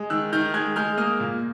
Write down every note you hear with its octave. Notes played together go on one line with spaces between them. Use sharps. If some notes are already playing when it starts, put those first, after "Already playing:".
Already playing: G#3
D#3 E6 F#6
D#3 F6 G6
G#3 F#6 G#6
G#3 F6 G6
A#3 D#6 F6
A#2